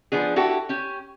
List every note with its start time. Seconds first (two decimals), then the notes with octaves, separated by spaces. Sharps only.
0.12 F3 B3 D4 G#4
0.36 E4 F#4 G4 A4
0.69 C#4 G4